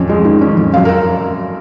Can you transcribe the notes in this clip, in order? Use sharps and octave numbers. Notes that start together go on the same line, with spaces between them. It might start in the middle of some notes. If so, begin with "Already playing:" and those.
Already playing: F2 C#4
G#3
D#3
C#4
F2
F#2 F5
A#4